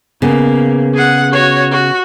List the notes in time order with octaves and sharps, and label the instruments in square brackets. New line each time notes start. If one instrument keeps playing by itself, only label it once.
[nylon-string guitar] C#3 B3 [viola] A#3
[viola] G#4 F#5
F#4 C#5
F#4